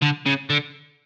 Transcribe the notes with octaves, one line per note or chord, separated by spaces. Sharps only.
D3
C#3
D3